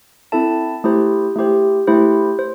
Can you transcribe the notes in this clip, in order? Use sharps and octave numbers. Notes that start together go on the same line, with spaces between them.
C4 E4 A4 E5 A5
A3 E4 G4 C5
A3 E4 G4 C5
A3 E4 G4 C5
C5